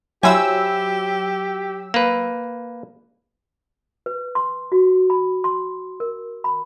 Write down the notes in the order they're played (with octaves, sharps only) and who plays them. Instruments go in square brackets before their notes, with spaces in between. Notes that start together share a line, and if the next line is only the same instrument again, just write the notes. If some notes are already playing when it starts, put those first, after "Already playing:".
[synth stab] F#3 E6 [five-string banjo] E4 C5 G#5 [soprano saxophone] G4
[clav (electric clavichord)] A#3 B4
[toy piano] B4
C6
F#4
B5
C6
A#4
B5